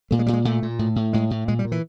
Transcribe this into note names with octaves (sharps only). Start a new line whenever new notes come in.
A#2 A3
G#3
A#2 G3
G#3
A#2 A3
A#2
A2
A2
A2 G#3
A2
A#2 G#3
G3
A#2
E3